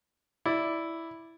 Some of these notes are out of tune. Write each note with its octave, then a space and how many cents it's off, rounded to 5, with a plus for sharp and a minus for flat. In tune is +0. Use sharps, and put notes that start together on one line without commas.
E4 +0 D5 +0